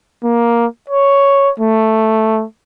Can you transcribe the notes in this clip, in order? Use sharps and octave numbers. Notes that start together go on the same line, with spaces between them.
A#3
C#5
A3